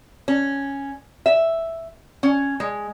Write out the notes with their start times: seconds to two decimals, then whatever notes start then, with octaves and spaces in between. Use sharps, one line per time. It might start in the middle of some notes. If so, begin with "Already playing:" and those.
0.28 C#4
1.26 E5
2.23 C#4
2.60 G#3